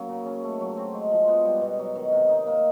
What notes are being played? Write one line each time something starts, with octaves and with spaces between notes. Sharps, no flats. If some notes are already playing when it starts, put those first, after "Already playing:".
Already playing: F#3 A#3 C#4
C#3
C#4
A3
F#3
C4
G#3
F3
B3
G3
B2
F#3
D#3
C3
D#4
A#3